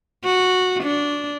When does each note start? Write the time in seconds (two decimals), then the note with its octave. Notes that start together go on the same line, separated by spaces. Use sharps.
0.24 F#4
0.83 D4